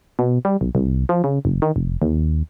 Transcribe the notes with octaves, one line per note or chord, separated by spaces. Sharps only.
B2
G3
B1
C2
F3
C#3
F#1
D#3
F1
D#2